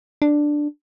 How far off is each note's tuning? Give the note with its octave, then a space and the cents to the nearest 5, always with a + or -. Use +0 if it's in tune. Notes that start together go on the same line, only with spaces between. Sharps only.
D4 +5